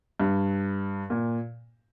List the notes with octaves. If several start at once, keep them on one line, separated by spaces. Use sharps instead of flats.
G2
A#2